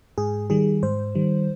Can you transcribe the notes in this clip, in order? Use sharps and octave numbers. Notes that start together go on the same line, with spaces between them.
G#2 G#4
D#3 G3 G#4
G#2 C5
D#3 G3